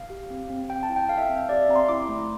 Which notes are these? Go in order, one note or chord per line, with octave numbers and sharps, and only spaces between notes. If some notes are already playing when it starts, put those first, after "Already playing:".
Already playing: F5
G4
C4
C4
C4 G5
A5
E4
G5
A4 F5
E5
F5
C4
E5
G4 D5
E5
C4 A#5
C6
E4 D6
A3